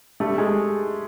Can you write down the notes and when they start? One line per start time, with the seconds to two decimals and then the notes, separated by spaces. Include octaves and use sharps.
0.20 G3 A3
0.38 G#3